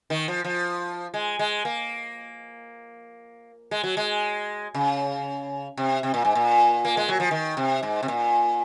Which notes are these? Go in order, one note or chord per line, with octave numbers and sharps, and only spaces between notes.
D#3
F3
F3
G#3
G#3
A#3
G#3
F#3
G#3
C#3
C3
C3
A#2
G#2
A#2
A#3
G#3
F#3
F3
D#3
C3
G#2
C3
A#2